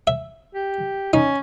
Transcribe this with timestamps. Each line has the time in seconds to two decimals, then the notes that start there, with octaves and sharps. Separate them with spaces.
0.07 E5
0.54 G4
1.13 C#4 D#4